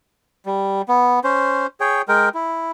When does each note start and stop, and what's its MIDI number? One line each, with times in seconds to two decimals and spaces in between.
0.46 0.82 55
0.88 1.20 59
1.24 1.67 61
1.24 1.67 72
1.80 2.02 68
1.80 2.02 73
1.80 2.02 79
2.08 2.29 56
2.08 2.29 70
2.08 2.29 79
2.34 2.71 64